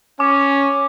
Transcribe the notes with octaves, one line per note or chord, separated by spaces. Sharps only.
C#4 D6